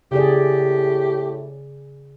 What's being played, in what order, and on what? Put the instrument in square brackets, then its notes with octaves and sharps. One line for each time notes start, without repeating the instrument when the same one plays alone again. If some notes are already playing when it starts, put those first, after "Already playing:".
[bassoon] A2 [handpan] C#3 G#4 D5 [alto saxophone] G4